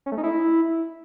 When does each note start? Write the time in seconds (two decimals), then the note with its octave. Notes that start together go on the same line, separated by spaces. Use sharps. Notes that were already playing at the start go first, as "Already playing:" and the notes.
0.06 C#4
0.12 A3
0.18 D#4
0.23 E4